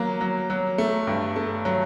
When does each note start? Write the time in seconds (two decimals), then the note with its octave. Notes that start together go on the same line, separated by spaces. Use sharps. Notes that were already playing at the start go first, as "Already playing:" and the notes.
Already playing: F#3 A#3
0.21 F#3
0.50 F#3
0.78 A3
1.07 G2
1.36 A3
1.65 F#3